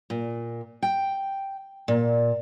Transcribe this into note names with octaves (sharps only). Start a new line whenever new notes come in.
A#2
G5
A#2